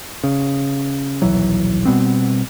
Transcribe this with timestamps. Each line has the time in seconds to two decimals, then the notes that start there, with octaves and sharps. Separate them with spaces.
0.24 C#3
1.22 D#1 B1 E3 F#3
1.86 B2 G3 B3 C4